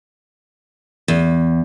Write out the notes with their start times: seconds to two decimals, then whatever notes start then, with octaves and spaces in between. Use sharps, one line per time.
1.08 E2